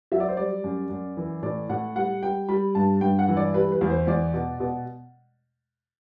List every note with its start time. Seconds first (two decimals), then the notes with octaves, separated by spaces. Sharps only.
0.12 F#3 E5
0.20 D5
0.28 C5
0.37 G3 D5
0.64 F#2
0.90 F#2
1.17 E3
1.43 A2 D5
1.69 A2 F#5
1.96 G3 F#5
2.23 G3 G5
2.49 G3 B5
2.75 G2 A5
3.01 G2 G5
3.19 F#5
3.28 E3
3.37 D5
3.54 G3 B4
3.72 B4
3.81 E2
3.90 C5
4.07 E2 D5
4.34 B2
4.60 B2